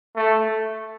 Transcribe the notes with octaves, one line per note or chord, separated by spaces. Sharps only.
A3